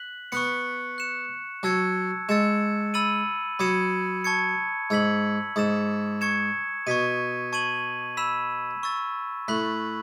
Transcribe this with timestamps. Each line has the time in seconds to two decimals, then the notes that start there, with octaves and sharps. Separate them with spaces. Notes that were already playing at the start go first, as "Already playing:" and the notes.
Already playing: F#6 B6 F#7
0.32 B3 C#6 F#6 C#7
0.98 F#6 C#7 E7
1.63 F#3 A5 E6 G#6 C#7
2.29 G#3 E6 A6 C#7 E7
2.94 B5 E6 A6 D#7 F#7
3.59 F#3 B5 D#6 G#6 C#7 E7
4.24 A5 C#6 G#6 C#7
4.90 G#2 E6 G#6 B6 F#7
5.56 G#2 D#6 A6 E7
6.21 C#6 G#6 C#7 E7
6.87 B2 C#6 G#6 B6 D#7
7.52 A5 C#6 G#6 D#7 F#7
8.17 B5 E6 B6 E7
8.83 C#6 E6 A6
9.48 A2 B5 F#6 B6 F#7